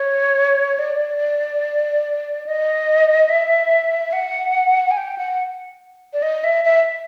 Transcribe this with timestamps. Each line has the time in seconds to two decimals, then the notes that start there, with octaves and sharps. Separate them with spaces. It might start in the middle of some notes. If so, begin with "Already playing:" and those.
Already playing: C#5
0.79 D5
2.46 D#5
3.29 E5
4.13 F#5
4.91 G#5
4.97 G5
5.18 F#5
6.13 D5
6.22 D#5
6.44 E5
6.65 E5